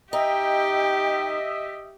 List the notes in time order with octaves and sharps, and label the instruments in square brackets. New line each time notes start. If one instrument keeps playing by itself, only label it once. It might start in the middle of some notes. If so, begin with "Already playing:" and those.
[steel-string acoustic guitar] D#4 [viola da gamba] G4 [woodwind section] D#5 E5 [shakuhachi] G5